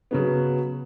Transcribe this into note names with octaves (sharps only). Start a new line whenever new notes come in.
C#3 F#3 B3